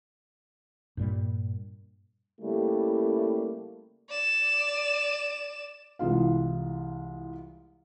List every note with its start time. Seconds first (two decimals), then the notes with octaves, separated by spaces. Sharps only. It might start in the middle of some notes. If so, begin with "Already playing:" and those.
0.97 G2 A#2 G3
2.41 C#3 G3 A3 A#3 E4 G4
4.09 D5 E7
5.99 C2 E3 G#3 F4 F5